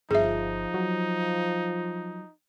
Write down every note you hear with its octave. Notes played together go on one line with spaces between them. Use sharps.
G1 F3 D#4 G#4 E5
F#3